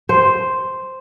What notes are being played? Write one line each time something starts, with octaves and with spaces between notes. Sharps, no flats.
C5